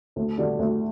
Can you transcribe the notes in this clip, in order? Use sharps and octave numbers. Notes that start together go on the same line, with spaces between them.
D2
D3 G3 D4 F#4
D2